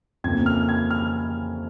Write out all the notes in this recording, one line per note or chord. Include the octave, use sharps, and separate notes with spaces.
F2 C#3 A#3 G#6
F6
G#6
F6